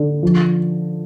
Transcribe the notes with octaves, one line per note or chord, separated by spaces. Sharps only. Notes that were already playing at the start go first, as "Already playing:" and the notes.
Already playing: D3
F3